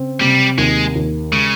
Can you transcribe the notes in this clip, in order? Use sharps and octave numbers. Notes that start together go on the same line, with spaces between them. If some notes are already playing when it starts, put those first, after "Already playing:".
Already playing: C#3 C4
C3 G3
D#2 G#3
D#2
C#3 G#3